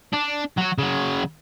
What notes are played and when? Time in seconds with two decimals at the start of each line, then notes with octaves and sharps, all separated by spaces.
0.13 D4
0.57 F#3 F#4
0.78 C#3 F#3